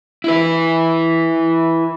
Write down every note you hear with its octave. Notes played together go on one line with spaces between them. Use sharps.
E4 B4